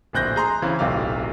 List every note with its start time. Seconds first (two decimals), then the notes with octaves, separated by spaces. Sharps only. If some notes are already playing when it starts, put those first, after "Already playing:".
0.13 D1 A#1 C4 F#6 G6 A#6
0.36 G#4 A#5 C6
0.62 C#3 E3 C4
0.79 D1 B1 C3 G4 F5